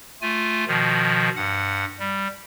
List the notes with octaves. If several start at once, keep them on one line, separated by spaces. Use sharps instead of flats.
A3 F4 G#5
B2 D#3 F3
G2 F#5
G3